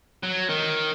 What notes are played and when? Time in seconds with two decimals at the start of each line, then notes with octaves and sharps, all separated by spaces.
0.23 F#3
0.49 D#3